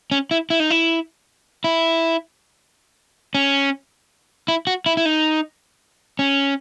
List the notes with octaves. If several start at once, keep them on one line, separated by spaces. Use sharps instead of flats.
C#4
E4
E4
D#4
E4
E4
C#4
E4
F#4
E4
E4
D#4
C#4